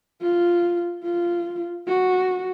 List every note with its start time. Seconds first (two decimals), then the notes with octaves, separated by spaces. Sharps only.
0.21 F4
1.04 F4
1.87 F#4